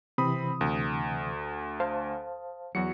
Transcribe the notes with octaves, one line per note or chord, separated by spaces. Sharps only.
C3 E3 C4 B5 D#6
D2
C5 F5 A5
E2 F#3 F#4 C#7